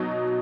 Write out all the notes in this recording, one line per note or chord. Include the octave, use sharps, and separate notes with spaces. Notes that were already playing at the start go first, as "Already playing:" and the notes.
Already playing: B2 F#3 D#4